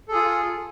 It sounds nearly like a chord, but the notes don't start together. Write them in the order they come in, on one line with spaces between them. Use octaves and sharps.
A4 G#4 F4